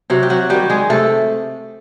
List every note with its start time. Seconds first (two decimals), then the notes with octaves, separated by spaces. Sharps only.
0.10 C3 F#3 F#4
0.23 G4
0.30 F#3 F#4
0.50 D#3 F#3 G3 G4
0.70 G#3 G#4
0.90 C3 A3 A4